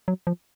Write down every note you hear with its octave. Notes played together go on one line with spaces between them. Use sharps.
F#3
F3